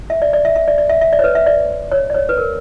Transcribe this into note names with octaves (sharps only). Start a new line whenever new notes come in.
E5
D5
D5
E5
E5
D5
D5
E5
E5
D5
C#5
B4
E5
D5
C#5
D5
C#5
B4
A#4